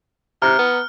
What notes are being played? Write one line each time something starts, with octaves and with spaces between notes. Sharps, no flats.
C3 A#5 F6 F#6
B3